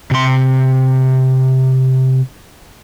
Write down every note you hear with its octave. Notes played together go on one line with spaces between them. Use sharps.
C3 C6